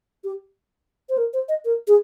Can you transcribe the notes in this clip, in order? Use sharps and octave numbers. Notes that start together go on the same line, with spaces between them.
G4
C5
A#4
C5
D#5
A#4
G#4